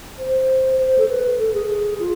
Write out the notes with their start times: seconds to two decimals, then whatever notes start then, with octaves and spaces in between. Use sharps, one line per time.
0.19 C5
0.79 C5
0.98 A4
1.09 B4
1.39 A4
1.54 G#4
2.00 F4